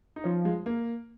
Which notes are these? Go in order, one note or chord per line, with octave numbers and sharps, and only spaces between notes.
D#4
F3 C#4
G#3
A#3